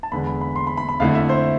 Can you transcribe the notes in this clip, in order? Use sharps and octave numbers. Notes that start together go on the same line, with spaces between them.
A5
E2 D3 G#3 B5
B5
B5
C6
B5
B5
B5
F2 D3 A3 E4 F5
E5
C5